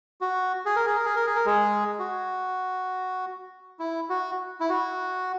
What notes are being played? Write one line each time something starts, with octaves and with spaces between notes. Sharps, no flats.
F#4
G#4
A#4
G#4
A#4
G#4
A#4
G#4
A#4
G#3 G#4
F#4
E4
F#4
E4
F#4